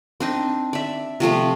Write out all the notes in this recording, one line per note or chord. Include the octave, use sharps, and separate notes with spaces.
C4 D4 D#4
D5 E5
C3 F3 A3 D6